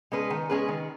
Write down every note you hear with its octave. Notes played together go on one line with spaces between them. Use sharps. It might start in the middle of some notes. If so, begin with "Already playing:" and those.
G#3 C#4 G#4 B4
D#3
G#3 C#4 G#4 B4
D#3